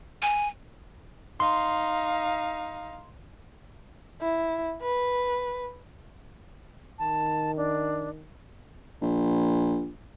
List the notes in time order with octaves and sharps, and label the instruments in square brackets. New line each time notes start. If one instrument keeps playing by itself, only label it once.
[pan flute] G#5
[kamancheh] D#4 F5 [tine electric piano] C6
[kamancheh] E4
B4
[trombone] D#3 [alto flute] A5
[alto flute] D4
[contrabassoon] A#1